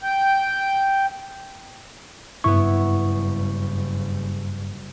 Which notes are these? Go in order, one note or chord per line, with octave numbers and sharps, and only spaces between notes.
G5
F#1 G2 G3 B3 E4 C#6